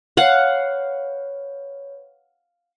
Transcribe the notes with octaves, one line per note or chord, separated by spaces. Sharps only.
B4 C#5 F5 F#5